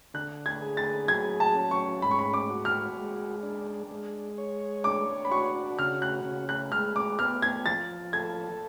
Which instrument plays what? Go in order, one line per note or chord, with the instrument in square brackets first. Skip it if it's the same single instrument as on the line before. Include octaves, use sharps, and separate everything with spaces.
[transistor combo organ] D3 [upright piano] F#6
[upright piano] G#6
[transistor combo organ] G#4
[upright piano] A6
[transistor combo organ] F#3 [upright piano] G#6
[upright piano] A5
[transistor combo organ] C#4
[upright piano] C#6
[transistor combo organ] G#2 [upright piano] B5
[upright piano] C#6
B5
D6
[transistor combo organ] F#4
[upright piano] F6
[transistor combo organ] G#3
D4
G#3
C#5
[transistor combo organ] D4 [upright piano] D6
[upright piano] B5
[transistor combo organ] F#4 [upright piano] C#6
[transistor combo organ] C#3 [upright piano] F6
[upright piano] F#6
[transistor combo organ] C#3
[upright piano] F#6
[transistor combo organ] G#3 [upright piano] F6
[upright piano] D6
[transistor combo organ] B3 [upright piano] F6
[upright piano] G#6
[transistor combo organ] F3 [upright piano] A6
[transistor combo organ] A4 [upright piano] G#6